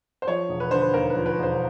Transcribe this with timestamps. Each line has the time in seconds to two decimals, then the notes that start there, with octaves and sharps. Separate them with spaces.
0.22 C5
0.27 F3 C#5
0.49 E1
0.60 B4
0.71 D3 C5
0.81 B4
0.93 D#2 A#4
1.10 B4
1.15 F3
1.26 B4
1.38 E1 C5